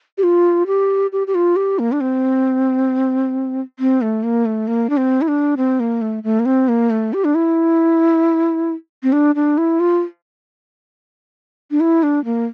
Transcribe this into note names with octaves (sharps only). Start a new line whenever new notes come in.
G4
F4
G4
G4
G4
F4
G4
A#3
D4
C4
C4
A3
A#3
A3
A#3
D4
C4
E4
D4
C4
A#3
A3
A3
A#3
C4
A#3
A3
G4
D4
E4
C4
D4
D4
E4
F4
D4
E4
D4
A#3